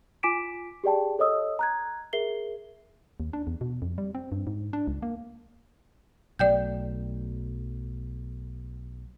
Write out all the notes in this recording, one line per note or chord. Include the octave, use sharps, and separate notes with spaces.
F4 G#5 D6 B6 D7 E7
G4 G#4 D5 G5 A5
A4 C#5 D#5 D#6 E6
A#5 F#6 G#6
G#4 A#4 E5 C7 G7
D#2
D4
E2
B2
F2
G3
C4
G2
G#2
D4
C#2
A#3
B1 F#3 A3 D5 G5 G6